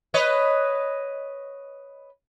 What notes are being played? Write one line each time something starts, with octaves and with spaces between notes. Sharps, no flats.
B4 C#5 D#5